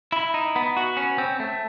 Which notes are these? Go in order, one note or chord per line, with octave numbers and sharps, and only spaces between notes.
E4
D#4
B3
F#4
C#4
C4
A3